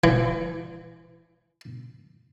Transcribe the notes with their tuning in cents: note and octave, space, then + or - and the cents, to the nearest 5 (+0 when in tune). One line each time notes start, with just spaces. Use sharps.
E3 +30